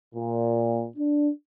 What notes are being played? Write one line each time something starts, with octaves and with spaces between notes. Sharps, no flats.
A#2
D4